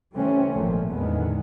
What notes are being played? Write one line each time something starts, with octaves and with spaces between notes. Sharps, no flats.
C#3 E3 G3 A3 C4 C#4
G#1 A#2 F3 A3 A#3
E2 A2 D3 D#3 G#3 B3